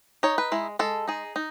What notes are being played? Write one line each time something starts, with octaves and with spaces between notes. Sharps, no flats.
D#4 C#5
B4
G#3 E4
G#3 A4
D#4 G#4
D#4